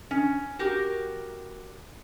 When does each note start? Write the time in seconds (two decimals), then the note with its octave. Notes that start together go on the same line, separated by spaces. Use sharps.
0.11 C#4
0.59 F#4 G4 A#4